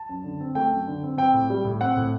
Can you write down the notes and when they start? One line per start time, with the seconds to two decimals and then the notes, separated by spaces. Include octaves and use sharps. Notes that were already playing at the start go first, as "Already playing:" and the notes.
Already playing: A5
0.09 F#2
0.24 D3
0.40 C4
0.55 A3 G5
0.71 F#2
0.87 D3
1.03 C4
1.18 C4 G5
1.33 A2
1.50 G3
1.65 A2
1.81 C4 F#5
1.96 A2